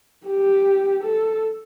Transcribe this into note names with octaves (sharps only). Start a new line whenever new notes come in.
G4
A4